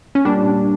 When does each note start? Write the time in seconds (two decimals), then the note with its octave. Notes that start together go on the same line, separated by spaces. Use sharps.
0.15 C#4
0.25 A#2 G3 D4